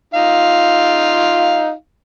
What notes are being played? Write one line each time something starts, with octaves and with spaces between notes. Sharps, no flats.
D#4 F4 F5